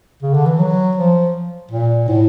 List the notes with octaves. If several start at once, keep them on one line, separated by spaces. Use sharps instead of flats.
C#3
D3
E3
F#3
F3
A#2
A2